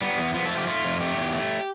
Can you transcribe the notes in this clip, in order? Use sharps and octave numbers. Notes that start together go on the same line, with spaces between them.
G3 B3
E2
F3 B3
A4
A3
G4
A3 F4
F2
A3 G4
E2
A3